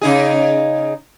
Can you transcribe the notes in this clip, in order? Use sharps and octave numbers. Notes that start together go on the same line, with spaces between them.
C#3 D#4 G#4